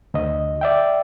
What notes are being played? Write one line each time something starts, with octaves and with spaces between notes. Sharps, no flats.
D2 D#5
D5 E5 G5